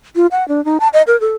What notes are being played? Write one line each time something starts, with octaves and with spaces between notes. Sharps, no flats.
F4
F#5
D4
D#4
A5
D#5
A#4
A4